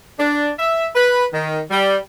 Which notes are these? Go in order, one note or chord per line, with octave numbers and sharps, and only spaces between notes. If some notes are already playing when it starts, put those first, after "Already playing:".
D4
E5
B4
D#3
G3